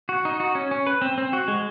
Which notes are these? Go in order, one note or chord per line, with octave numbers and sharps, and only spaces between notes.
F#4
D#4
F#4
C#4
C#4
B4
C4
C4
F#4
G#3